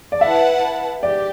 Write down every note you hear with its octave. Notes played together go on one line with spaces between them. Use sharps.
D5
E4 B4 E5 F#5 A5
G4 D5